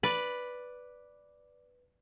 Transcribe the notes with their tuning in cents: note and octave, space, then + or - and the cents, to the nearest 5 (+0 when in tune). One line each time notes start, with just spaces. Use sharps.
B4 +0 D5 +0